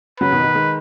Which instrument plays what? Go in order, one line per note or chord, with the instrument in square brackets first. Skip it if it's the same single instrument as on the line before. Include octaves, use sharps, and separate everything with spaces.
[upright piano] C#3 F#3 [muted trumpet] B4
[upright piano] B2 D#3
B2 D#3
D#3 G#3